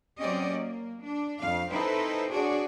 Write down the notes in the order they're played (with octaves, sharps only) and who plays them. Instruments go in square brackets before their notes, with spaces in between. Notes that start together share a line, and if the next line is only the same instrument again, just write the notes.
[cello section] F#3 C4 C#4 G4 D5 D#5
A#3
D4
F2 F5
C4 D#4 E4 A4 B4 C5
D4 F#4 G#4 C#5 D5